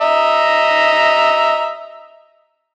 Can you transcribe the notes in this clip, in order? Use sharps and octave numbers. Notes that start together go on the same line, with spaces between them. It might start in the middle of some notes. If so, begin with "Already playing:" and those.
D#5 E5 A#5